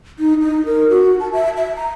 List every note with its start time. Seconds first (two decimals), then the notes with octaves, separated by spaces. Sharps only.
0.19 D#4
0.41 D#4
0.66 A#4
0.90 F#4
1.20 A5
1.33 E5
1.57 E5
1.76 A#5